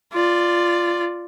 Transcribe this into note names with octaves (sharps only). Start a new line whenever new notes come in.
F4 D5